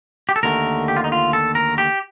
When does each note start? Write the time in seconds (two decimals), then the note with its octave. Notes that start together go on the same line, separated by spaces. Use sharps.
0.29 G4
0.36 A4
0.43 D#2 D3 A3 A#4
0.88 G4
0.97 F4
1.04 D#4
1.12 F4
1.33 A4
1.55 A#4
1.78 G4